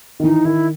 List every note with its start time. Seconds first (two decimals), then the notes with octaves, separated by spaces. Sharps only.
0.20 D#3
0.24 E3 D#4
0.45 D#3 E4